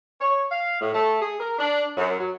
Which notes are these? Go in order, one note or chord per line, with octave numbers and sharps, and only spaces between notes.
C#5
F5
A2
A3
G#4
A#4
D4
F#2
F#3